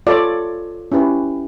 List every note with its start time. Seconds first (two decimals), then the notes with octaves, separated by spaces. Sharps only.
0.07 F4 A4 C#5 D5
0.92 C#4 E4 G4 B4